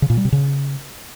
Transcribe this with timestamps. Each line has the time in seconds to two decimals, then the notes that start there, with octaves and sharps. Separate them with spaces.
0.02 C#3
0.10 A#2
0.17 G3
0.25 C3
0.32 C#3